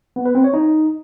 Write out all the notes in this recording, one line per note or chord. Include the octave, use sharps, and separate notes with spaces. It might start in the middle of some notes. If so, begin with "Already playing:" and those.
B3
B4
C4
C#5
D#4